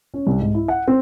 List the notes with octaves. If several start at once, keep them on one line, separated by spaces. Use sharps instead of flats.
C#4
C2
G#2
E4
F#5
C4